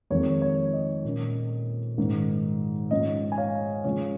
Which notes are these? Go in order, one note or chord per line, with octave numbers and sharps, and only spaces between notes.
F2 D#3 G#3 C#5
C#5
D#5
A#2 A#3 C#4
G#2 D#3 C#4
G#2 F3 C#4 D#5
G#5
C#5 F5
C#3 F3 G#3 C#5